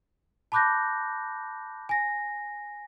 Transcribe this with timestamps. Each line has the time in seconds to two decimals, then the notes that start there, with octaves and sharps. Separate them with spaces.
0.52 A5 B5 D6 F#6 G6 A#6
1.89 G#5 A#6